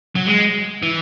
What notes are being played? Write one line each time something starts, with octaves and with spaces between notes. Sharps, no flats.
F#3
G#3
E3